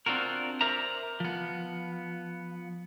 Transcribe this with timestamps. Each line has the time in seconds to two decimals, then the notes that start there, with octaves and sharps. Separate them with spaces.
0.06 C4 D4 F4 F#4 A#4
0.61 A#4 C5 D5 E5 A#5
1.20 F3 B3